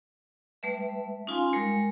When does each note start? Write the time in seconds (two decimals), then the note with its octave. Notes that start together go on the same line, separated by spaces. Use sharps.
0.63 G3 A3 B4 E5
1.27 C#4 D#4 F4 F5 G#5 C6
1.53 G3 G#3 A#4